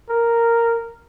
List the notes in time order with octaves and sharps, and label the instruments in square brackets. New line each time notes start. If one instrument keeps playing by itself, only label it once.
[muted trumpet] A#4